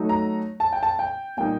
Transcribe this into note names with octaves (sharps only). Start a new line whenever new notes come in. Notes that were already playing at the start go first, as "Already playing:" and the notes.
Already playing: F#3 A3 D#4
A#5
A5
G5
A5
G5
A#2 G3 A#3 D#4 G5